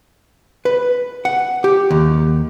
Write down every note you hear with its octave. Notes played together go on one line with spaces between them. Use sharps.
B4
F#5
G4
D#2